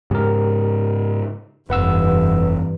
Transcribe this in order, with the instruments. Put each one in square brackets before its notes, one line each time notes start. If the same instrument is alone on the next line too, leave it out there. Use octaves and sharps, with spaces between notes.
[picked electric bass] G#2 C#3 [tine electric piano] G4 A#4
[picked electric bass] F1 [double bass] G2 E3 [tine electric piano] B4 F#5 E6